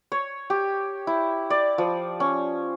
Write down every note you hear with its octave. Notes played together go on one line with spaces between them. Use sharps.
C#5
G4
E4
D5
F3
C#4